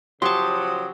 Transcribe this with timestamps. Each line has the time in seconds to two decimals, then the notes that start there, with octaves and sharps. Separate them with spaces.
0.22 C#3 F3 F#3 G4 A5 C6 D#6